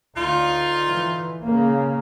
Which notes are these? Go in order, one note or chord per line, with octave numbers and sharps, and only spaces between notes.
D2 D#4 F4
E3
C#3 A#3